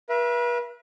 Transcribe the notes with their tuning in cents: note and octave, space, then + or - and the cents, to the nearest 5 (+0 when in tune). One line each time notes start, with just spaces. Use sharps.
B4 -40 E5 +35